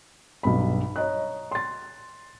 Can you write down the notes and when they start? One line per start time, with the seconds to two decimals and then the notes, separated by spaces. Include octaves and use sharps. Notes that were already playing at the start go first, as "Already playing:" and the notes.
0.43 B1 G2 B5
0.96 C#5 D#5 A#5 F#6
1.51 C6 A6